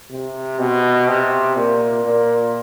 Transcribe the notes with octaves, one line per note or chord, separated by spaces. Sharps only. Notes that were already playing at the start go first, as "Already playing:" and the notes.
C3
B2
C3
A#2
A#2